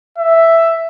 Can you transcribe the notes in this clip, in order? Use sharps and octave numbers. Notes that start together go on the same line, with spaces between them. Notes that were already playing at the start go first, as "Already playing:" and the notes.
E5